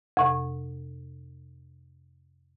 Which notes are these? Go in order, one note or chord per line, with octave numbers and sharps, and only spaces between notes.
F2 C3